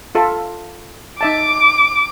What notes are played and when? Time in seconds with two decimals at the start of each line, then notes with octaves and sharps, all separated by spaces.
0.15 F4 A4 E5
1.21 D#4 E5 A5 D6